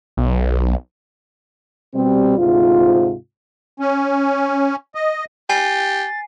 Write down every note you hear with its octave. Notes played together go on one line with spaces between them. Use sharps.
B1
B2 G3 C4
D2 G#2 C3 F4
C#4
D#5
G4 G#5 A6 C7